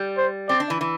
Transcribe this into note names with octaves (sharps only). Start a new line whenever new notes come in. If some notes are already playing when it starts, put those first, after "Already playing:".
Already playing: G3
C5
C4 D5
D4
E3
E3